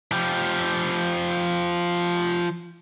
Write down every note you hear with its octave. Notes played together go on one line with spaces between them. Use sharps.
F3 G4